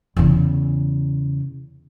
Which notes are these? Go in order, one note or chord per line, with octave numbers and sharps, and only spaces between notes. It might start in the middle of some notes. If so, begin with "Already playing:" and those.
E2 C#3